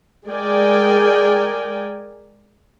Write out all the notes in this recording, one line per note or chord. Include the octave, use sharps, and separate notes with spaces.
G#3 G#4 A#4 D5 G5 G#5